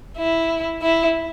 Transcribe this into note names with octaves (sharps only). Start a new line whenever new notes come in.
E4
E4